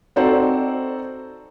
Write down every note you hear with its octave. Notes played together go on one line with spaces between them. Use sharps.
C4 D#4 F#4 A4 C5 D5